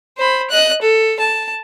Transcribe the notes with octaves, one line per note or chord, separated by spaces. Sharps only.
C5 B5
D#5 F#6
A4
A5